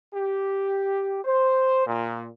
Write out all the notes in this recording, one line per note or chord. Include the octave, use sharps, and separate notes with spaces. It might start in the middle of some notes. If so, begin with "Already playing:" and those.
G4
C5
A#2